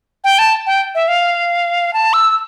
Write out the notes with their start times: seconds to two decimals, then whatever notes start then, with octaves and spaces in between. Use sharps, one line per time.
0.24 G5
0.39 A5
0.67 G5
0.95 E5
1.08 F5
1.93 A5
2.13 E6